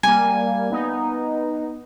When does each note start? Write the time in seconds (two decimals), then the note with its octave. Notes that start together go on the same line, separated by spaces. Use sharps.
0.03 G3 A#3 G#5
0.70 B3 D#4